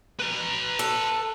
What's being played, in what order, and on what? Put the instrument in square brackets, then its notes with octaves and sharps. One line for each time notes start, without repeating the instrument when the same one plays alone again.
[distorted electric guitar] B4 A#5
[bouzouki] A4